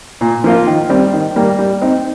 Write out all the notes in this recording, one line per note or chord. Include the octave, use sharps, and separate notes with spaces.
A#2
F3 A#3 F4
D#3
G3 C4
D#3
G3 A#3
G3
C4 D#4